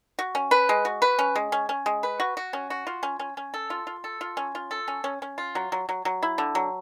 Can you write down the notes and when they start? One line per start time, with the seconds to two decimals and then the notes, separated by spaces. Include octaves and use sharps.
0.19 F#4
0.35 C#4
0.51 B4
0.69 G#3
0.85 F#4
1.02 B4
1.19 C#4
1.36 G#3
1.52 C#4
1.69 C#4
1.86 G#3
2.03 B4
2.20 F#4
2.37 F#4
2.53 C#4
2.70 F#4
2.87 F4
3.03 C#4
3.19 C#4
3.37 C#4
3.54 A4
3.70 F4
3.87 F4
4.04 A4
4.21 F4
4.37 C#4
4.55 F4
4.71 A4
4.88 C#4
5.04 C#4
5.22 C#4
5.38 F4
5.55 F#3
5.72 F#3
5.89 F#3
6.05 F#3
6.23 E4
6.38 D3
6.55 F#3